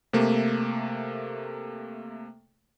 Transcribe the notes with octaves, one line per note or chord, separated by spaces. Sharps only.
C3 A3 A#3